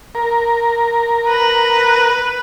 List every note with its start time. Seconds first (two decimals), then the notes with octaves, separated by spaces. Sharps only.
0.15 A#4
1.28 B4